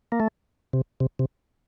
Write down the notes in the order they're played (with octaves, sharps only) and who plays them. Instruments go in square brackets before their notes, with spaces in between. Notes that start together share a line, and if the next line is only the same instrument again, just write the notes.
[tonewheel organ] A#3
A3
C3
C3
C3